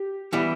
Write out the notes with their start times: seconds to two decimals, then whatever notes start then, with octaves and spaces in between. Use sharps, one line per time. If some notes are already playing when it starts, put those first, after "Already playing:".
Already playing: G4
0.33 E3 G3 B3 E4